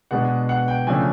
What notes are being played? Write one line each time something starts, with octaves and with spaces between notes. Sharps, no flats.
B2 G#3 B3 D4 F#5
F#5
G5
C#3 F3 A3 D4 G#5